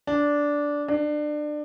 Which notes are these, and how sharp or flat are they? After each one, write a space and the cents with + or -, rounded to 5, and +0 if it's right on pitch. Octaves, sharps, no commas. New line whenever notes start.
D4 -10
D4 +25